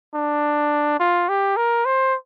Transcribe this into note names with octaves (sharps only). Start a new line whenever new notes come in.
D4
F4
G4
A#4
C5